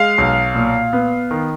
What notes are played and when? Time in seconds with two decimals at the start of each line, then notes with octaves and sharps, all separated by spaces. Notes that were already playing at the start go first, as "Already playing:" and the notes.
Already playing: G#3 F5 F6
0.18 B1
0.55 A#2
0.93 B3
1.31 D#3